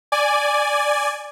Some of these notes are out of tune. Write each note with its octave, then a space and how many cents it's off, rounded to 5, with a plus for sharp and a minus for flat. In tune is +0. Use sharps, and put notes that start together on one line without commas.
D5 +0 G#5 +0